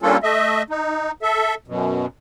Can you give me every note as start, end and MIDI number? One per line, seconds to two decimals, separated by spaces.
0.02 0.17 55
0.02 0.17 58
0.02 0.17 61
0.02 0.17 62
0.02 0.17 65
0.02 0.17 69
0.23 0.62 57
0.23 0.62 75
0.23 0.62 76
0.70 1.11 63
1.22 1.54 69
1.22 1.54 76
1.68 2.06 42
1.68 2.06 47